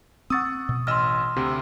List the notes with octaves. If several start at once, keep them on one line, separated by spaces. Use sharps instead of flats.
C4 F#5 C#6 D#6 E6 A6
B2
A1 D#5 C6 E6 F6
D2 C3